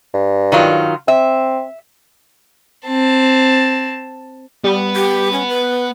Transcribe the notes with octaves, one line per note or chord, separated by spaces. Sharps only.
G2
D#3 F#3 F4
C4 E5
C4 A5
G3 B3
G4
C#4
B4